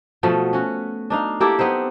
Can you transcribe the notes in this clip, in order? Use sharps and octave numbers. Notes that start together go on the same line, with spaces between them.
B2 F3 A3 B3
C#4 F#4
D4 D#4 F5
A#3 E4 G4 A4
B3 C4 D#4 C5